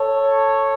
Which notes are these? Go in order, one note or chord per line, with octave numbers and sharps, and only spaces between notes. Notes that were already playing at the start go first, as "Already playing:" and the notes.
Already playing: A4 C#5